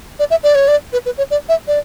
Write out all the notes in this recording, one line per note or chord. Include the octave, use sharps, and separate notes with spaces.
D5
E5
D5
C#5
D5
B4
B4
C#5
D5
E5
D5